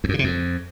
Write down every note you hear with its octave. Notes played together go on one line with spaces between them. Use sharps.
E2
F#2
C#3
C3
F2